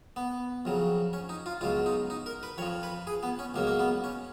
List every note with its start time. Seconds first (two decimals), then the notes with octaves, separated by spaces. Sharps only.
0.16 B3
0.65 F2 C#3 F#3
1.13 C#4
1.29 D#4
1.46 F4
1.61 C#2 B2 F#3 F4
1.86 D#4
2.10 D#4
2.26 A#4
2.43 B4
2.58 F2 C#5
2.62 F3
2.83 B4
3.07 G#4
3.23 B3
3.39 C#4
3.54 C#2 B2 F#3 A#3
3.67 A#3
3.80 B3
4.04 C#4